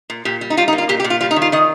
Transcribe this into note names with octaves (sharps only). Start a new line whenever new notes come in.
A#2
A#2 G4
G3
D#4
G3 F4
D#4
A#3
F4
A#2 G4
G4
A#2
F4
G3 F4
D#4
D#3
F4
D#3 D#5